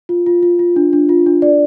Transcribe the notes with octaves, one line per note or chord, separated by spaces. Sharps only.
F4
F4
F4
F4
D4
D4
F4
D4
D5